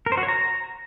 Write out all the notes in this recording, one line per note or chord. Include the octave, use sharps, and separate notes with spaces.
A#4
C5
F#4
C#5
A#5